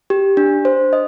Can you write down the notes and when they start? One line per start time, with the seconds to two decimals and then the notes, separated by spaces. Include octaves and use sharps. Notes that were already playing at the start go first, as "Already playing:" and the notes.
0.10 G4
0.37 D4
0.65 C5
0.93 D#5